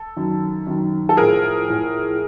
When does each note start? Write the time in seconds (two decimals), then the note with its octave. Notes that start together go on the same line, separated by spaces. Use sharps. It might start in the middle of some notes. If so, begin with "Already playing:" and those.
Already playing: A4
0.16 F#2 D#3
0.67 F#2 D#3
1.09 A4
1.17 A2 F3 G#4 A#4
1.68 A2 F3